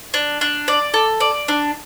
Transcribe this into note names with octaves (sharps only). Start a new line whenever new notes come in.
D4
D4
D5
A4
D5
D4